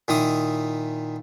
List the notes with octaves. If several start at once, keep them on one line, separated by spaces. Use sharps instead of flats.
A#2 D#3 E4 D#6